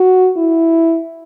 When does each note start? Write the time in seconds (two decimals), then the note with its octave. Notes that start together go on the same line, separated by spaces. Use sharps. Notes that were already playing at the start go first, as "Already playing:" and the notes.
Already playing: F#4
0.37 E4